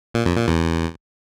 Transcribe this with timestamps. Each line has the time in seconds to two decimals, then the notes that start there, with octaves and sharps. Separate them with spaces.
0.14 A#2
0.26 F2
0.37 A#2
0.48 E2